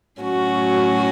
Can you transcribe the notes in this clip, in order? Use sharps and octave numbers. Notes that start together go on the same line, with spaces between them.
A2 F#3 C#4 F#4